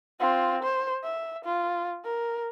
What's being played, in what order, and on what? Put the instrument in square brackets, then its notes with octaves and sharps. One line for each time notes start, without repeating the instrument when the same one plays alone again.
[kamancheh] C4 F4
C5
E5
F4
A#4